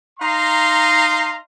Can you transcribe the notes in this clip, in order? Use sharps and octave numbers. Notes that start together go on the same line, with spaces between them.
D#4 F5 A#5 C6